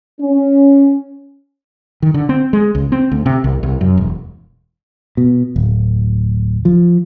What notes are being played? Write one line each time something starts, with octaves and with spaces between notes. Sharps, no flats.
C#4
D#3
D3
C4
G#3
C#2
C4
D2
C3
C2
C2
F#2
E1
B2
D1
F3